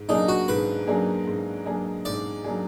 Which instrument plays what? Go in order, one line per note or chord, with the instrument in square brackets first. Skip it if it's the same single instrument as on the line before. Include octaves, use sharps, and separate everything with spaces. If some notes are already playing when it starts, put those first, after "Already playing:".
Already playing: [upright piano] G#2
[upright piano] F#3 A#3 D4 G#4 [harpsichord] D#4
[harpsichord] F#4
[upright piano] G#2 [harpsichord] B4
[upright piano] F#3 A#3 D4 G#4
G#2
F#3 A#3 D4 G#4
[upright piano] G#2 [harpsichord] D5
[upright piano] F#3 A#3 D4 G#4